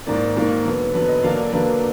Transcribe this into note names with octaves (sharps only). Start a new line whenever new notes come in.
G#2 D#3 A#3 D5
G#2 D#3 A#3
D3 F#3 B3
D3 F#3 B3 B4
D#5
D3 F#3 A#3 D4 F5
D5
D3 F#3 A#3 D4 B4